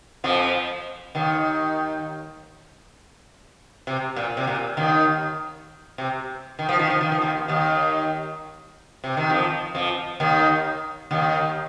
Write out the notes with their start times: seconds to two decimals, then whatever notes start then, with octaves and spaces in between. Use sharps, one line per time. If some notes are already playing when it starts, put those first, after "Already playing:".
0.24 F2 F3
1.15 D#2 D#3
3.87 C3
4.16 A#2
4.37 C3
4.47 A#2
4.77 D#2 D#3
5.98 C3
6.59 D#3
6.69 F3
6.79 D#3
6.90 F3
7.01 D#3
7.12 F3
7.22 D#2 D#3
7.48 D#2 D#3
9.04 C3
9.17 D#3
9.30 F2 F3
9.75 F2 F3
10.20 D#2 D#3
11.11 D#2 D#3